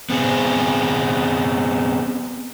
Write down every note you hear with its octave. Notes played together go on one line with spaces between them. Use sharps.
B3 C4 G#4